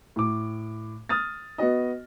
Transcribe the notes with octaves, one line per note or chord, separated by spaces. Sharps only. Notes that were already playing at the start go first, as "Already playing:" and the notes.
A2 D6
D#6 F6 A6
B3 F#4 D#5